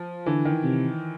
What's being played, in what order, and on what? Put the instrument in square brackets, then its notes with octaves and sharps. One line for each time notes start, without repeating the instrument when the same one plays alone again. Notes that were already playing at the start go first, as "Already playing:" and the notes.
Already playing: [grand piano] F3
[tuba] D3 [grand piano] E3
[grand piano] D#3
[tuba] C3